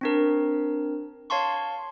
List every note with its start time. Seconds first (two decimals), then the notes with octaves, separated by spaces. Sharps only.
0.01 C4 D4 A#4
1.30 C#5 F5 A5 C6 C#6